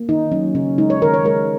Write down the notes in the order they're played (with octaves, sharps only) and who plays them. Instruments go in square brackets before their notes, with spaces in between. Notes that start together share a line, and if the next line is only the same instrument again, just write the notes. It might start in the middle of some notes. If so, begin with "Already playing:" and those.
Already playing: [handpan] A#3
D#3 D#4
F#3 C#4
C#3 C#4
G#3 D#4
C#5
D#3 A#4
C#5
G#3 A#4